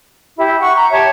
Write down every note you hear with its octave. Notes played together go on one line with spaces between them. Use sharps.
E4 G4
F#5 C#6
A#5
G4 C#5 E5 A5